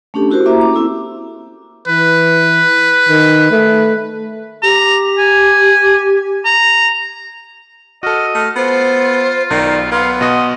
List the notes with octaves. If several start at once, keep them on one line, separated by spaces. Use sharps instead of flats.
A3 C#4 D4 G4 A4
E4 F#4 G4 A#4 C5
A#3 E4 E5 A#5 D6
C#4 D6
C4 E4 G4 A4
E3 B4
D#3
A3
G4 A#5
G#5
A#5
F#4 A4 D#5 F6
A3 F6
B3 F4 C5
B1 D#3 D5
B3 F5 C6
B2 F#4 D#5